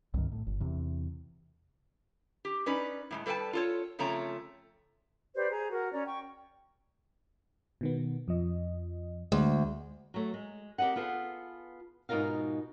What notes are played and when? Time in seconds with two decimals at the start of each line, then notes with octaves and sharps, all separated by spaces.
0.14 C2 G2 D#3
0.32 A2
0.47 G1
0.60 E2 C3
2.45 G4
2.66 C#4 D#4 B4 D5
3.11 A2 G3 G#3
3.26 G3 A4 B4 D5 G5 A5
3.53 F4 A4 C#5
3.99 C#3 F3 A3 C4 C#5 A#5
5.35 G4 B4 C5 D5
5.50 G#4 A#5
5.71 F#4 A#4 F#5
5.92 C#4 D5 A#5
6.06 G5 C#6
7.81 B2 D#3 B3
8.28 F2 F3 D#5
9.32 D2 G#3
10.14 F#3 A3
10.34 G#3
10.78 C4 G4 A#4 D#5 F#5
10.96 B3 F4 G#4 A4
12.09 G#2 B2 D#4 F4 A#4 F5